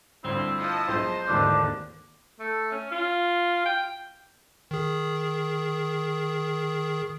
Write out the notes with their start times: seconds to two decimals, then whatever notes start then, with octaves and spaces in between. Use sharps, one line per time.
0.24 D2 G2 F3 C4 E4
0.57 F3 D#5 A5
0.88 B1 F3 G#3 C5
1.28 G#1 D#2 G#2 D3 E3 D4 E6
2.40 A3
2.72 C#4
2.91 F4
3.66 G5
4.71 D#3 G#4